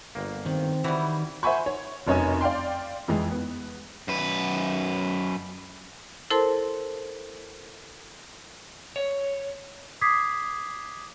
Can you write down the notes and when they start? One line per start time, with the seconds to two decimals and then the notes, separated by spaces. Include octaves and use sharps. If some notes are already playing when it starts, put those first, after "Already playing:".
0.15 G1 A#3
0.46 D#3 C4
0.84 D#3 E3 G3 E4 F#4
1.43 C5 E5 F#5 G#5 B5 C#6
1.66 C#5
2.07 F1 F#2 C#5 D#5 G#5
2.41 D5 F5 G5 C6
3.08 F2 E3 G#3
3.31 B3
4.08 F#2 B4
6.30 E4 A4 A#4 C5 A5 C6
8.96 C#5
10.01 D6 D#6 G#6 B6 C7